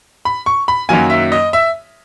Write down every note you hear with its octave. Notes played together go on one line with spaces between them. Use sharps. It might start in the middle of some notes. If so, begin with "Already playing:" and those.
B5
C#6
B5
F#2 D#3 F#3 A#3 G#5
E5
D#5
E5